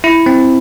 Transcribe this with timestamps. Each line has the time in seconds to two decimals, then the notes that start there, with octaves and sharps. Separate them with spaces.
0.04 E4
0.26 C4